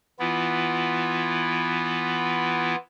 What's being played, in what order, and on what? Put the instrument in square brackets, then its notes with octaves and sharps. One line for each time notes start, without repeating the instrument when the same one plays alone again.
[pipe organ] E3 B3 E4 F4